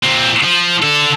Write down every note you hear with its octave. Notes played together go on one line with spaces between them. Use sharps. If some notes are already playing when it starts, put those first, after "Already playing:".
A#2 C4
F3
D3 A4